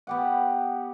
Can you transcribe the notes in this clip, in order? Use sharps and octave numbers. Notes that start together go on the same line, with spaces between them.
B3 G4 F#5